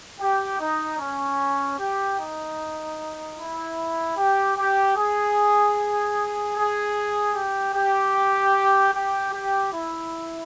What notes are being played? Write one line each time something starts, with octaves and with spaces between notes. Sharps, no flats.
G4
D#4
C#4
G4
D#4
E4
G4
G4
G#4
G#4
G4
G4
G4
G4
E4